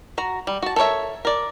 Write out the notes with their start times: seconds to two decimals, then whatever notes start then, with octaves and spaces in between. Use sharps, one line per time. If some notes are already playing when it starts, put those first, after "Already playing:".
0.18 F#4 A#5
0.47 G3
0.63 F#4 A5
0.76 A4 A#4 C5 C#5 E5
1.25 A#4 D5